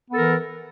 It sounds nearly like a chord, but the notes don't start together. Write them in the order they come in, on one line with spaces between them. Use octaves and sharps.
B3 A4 A#4 E3